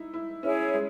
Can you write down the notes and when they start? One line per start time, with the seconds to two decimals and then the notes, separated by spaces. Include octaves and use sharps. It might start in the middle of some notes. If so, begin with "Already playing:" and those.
Already playing: D#4 E4
0.14 E4
0.43 C#4 E4 G#4 C#5
0.74 G#3